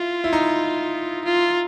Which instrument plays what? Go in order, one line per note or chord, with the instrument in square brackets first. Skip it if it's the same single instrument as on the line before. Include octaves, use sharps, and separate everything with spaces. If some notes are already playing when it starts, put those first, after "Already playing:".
Already playing: [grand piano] E4 [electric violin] F4
[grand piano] E4
D#4
[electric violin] F4